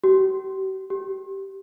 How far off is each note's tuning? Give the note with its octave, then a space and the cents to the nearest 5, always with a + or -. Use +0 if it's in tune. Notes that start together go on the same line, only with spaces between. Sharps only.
G4 -45
G4 -15